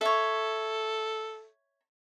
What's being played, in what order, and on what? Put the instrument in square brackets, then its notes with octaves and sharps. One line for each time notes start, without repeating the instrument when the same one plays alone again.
[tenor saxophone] A4 [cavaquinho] C#5 E5